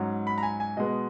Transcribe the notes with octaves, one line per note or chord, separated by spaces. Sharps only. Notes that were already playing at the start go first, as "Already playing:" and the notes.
Already playing: G#2 F#3 C#4
B5
A#5
G#5
G#5
B2 G#3 B3 D#5